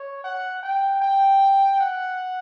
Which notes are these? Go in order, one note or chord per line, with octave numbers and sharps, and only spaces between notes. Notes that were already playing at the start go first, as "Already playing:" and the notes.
Already playing: C#5
F#5
G5
G5
F#5